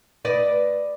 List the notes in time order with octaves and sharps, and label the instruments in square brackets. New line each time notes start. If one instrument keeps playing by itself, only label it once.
[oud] B4 D5 D#5